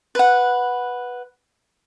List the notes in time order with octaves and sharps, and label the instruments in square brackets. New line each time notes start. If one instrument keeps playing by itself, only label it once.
[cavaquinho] B4 F#5